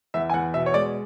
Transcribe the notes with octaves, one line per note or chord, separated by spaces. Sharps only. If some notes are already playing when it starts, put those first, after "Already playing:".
E2 E5
G#5
E2 F#5
B2 E5
C#5
G#3 D5